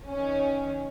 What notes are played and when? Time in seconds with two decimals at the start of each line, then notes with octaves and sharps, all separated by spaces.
0.11 D#3 C#4